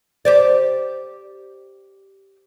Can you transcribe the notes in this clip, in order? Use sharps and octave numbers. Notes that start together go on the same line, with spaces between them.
G4 C5 D5